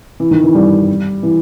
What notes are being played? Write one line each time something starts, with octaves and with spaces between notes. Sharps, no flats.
E3
D#3
E3
G3
E3